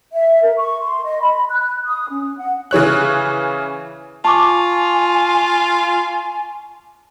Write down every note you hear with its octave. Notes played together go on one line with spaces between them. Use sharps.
E5
A#4
C#6
C6
D#5
B5
F#6
D#6
C#4
F#5
C#3 E3 C#5 F#6
F4 G#5 A5 C#6 D6